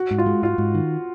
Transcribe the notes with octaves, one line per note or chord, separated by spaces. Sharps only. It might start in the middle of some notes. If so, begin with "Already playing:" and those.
Already playing: F#4
G#2
F4
G#3
G#2 F4
G#2
D#3